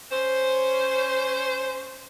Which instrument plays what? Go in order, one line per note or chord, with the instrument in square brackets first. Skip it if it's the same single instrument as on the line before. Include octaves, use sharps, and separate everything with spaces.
[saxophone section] C#4 C5